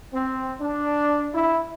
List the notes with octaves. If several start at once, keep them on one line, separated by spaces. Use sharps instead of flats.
C4
D4
E4